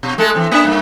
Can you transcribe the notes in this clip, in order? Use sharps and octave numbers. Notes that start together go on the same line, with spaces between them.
B2
G#3 A3 A4
E3 C4
A#3 D4 E5
G2 A#3